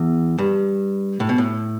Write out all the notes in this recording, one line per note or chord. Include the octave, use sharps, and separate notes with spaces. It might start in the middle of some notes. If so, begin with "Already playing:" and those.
Already playing: E2
G2
A2
B2
A2